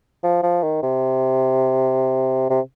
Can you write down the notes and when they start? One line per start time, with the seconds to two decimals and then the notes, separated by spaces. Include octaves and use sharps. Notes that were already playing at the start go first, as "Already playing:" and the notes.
0.23 F3
0.43 F3
0.63 D#3
0.83 C3
2.50 C3